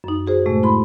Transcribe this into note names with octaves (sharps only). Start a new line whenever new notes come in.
F#2 D#4
F#4 G#4 C5
A2 C3 G#3 A3
E4 B5 C6